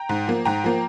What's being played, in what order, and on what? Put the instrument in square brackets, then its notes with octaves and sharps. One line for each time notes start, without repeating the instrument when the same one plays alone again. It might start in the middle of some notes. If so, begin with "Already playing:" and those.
Already playing: [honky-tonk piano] G5 A#5
G#2
F3 A#3
G#2 G5 A#5
F3 A#3